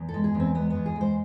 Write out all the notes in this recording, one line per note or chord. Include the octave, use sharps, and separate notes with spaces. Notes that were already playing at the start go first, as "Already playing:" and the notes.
Already playing: E2
A4
G#3
G#4
E2
C4
G#3 B3
E2 B3
G#4
G#3
C5